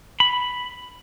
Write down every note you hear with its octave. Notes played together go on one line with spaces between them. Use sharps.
B5